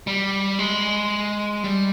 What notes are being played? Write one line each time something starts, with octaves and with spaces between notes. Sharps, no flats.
G3
G#3
G3